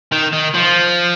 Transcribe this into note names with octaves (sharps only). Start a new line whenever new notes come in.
D#3
D#3
F3